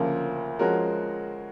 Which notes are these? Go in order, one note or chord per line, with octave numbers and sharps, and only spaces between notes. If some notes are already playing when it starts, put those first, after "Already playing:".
Already playing: D2 C#3 F3 A#3
F3 G#3 C#4 F#4 A#4